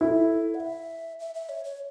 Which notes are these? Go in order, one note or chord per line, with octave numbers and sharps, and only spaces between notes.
E4 A4
F#5
E5
E5
E5
C#5
C#5